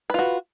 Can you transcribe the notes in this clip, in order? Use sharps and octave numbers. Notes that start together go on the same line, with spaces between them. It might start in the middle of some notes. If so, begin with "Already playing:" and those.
F4 F#4 B4